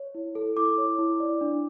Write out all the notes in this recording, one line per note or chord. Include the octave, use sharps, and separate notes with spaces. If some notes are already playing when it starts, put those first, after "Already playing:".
Already playing: C#5
E4
A4
E4 D6
C#5
E4
D5
D4